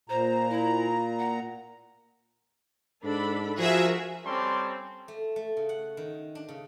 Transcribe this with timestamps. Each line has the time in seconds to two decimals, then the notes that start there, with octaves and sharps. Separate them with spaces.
0.09 A#2 C5 A#5
0.50 E4
1.19 F#5
3.04 G#2 D4 A4 B5
3.58 F3 F#4 G#4 A#4 E5
4.26 G3 C4 C#4 A4 C6 D6
5.08 A3
5.36 A3
5.57 C#3
5.69 F#5
5.97 D#3
6.35 D4
6.48 C#3